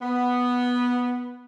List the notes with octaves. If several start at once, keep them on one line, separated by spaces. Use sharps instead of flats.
B3